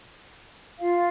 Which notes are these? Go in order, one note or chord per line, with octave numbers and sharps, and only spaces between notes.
F4 F5